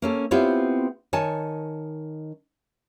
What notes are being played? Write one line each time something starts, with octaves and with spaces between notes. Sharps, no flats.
A#3 C#4 A4
B3 C4 E4 F4 G4 C#5
D#3 C#5 G#5 A5